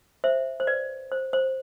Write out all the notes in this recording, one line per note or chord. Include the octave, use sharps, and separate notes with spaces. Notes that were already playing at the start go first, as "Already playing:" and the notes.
C5 E5
C5
B4 D5
C5
C5